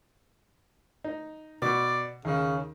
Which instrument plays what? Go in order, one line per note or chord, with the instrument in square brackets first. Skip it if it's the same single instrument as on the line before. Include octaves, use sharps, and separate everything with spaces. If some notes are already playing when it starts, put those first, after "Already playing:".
[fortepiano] D#4
[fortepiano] B2 [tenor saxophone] D5
[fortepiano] D#2 [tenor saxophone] C#3